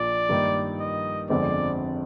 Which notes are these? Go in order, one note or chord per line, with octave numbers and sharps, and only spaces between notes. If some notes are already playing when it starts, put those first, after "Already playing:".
Already playing: A#1 A#2 D5
G2 D#3 A#3 D#4
D#5
G1 F2 D3 G#3 C4 D5